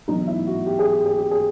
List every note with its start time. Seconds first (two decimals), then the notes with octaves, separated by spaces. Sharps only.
0.08 B1 A2 E3 D#4
0.27 E4
0.47 F#4
0.67 G4
0.79 G#4
0.92 G4
1.05 G#4
1.18 G4
1.31 G#4